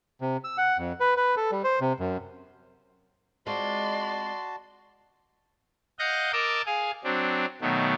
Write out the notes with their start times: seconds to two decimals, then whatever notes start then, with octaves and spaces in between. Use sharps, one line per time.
0.21 C3
0.44 E6
0.58 F#5
0.78 F2
1.00 B4
1.17 B4
1.37 A4
1.52 G3
1.64 C5
1.81 C3
2.00 F#2
3.46 G#3 C4 F4 F#4 D5 A5 C6
5.99 D#5 F5 F#5 G6 A#6
6.33 A#4 D#5 A5 D6 E6
6.66 G#4 F5 G#5
7.04 F#3 C4 D4
7.61 B2 D#3 F#3 A3